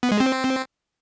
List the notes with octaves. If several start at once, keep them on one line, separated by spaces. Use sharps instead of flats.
B3
G#3
C4